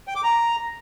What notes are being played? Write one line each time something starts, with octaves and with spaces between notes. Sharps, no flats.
G5
D6
A#5